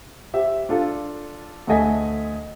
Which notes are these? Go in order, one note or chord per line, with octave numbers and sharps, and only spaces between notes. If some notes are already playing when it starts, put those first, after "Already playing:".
G4 C5 E5
D4 F4 A4
D2 A3 A4 D#5 G#5 B6